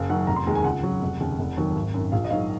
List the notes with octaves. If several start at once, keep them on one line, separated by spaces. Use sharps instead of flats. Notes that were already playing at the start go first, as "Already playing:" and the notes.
Already playing: F#1 F5
F#2 D#3 F#3 F#5
F1 A#5
C6
D#2 D#3 G#3 A#5
G#5
C#2 F#5
C#3 F#3
F1
D#2 C#3
F1
D#2 D#3 F#3
G#1
F#2 D#3
A#1 F5
D#5
G#2 D#3 F#3 F5